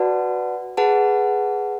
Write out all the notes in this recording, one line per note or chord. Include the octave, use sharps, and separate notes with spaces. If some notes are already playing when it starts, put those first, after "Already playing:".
Already playing: F#4 B4 D5 F#5 A5
G#4 B4 F#5 A5